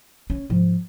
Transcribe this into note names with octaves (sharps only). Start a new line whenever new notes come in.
C#4
G#2 F3